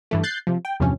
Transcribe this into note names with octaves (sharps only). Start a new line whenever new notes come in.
G2 E3 A3
F#6 G6 A6 C7
C3 F3
G5
E2 G2 C3 F3 C#4